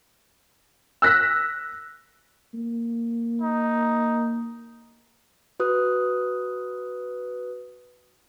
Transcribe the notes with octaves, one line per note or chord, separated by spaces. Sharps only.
E6 F#6 A#6 B6
A#3
D#4
F#4 B4 D#6 F#6